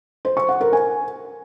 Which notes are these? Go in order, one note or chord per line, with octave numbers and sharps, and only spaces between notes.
C5
C#6
F#5
A#4
G#5